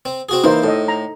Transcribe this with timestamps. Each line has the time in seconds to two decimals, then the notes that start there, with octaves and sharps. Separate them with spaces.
0.05 C4
0.29 C4 F#4 G#4
0.44 E3 A#3 D#4 E4 C5
0.64 A2 A4 D#5
0.88 A#5